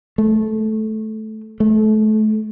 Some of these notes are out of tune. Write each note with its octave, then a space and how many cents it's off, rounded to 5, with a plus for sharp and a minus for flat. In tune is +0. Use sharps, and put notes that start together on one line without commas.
A3 -15
A3 -30